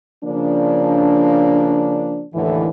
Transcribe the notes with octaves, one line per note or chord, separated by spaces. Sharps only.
C#3 F3 A#3 D4
D#2 A2 D3 E3